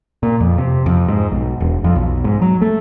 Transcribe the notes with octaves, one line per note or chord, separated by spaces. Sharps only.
A#2
F2
C3
F2
G#2
B1
E1
F2
B1
G#2
F#3
A3